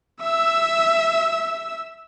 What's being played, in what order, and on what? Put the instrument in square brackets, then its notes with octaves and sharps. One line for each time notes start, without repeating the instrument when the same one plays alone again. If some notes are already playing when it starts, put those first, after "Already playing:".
[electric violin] E5 E6